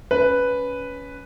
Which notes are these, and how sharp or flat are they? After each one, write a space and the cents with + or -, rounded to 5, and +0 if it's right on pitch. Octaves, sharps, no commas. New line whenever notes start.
C#4 +15 B4 +0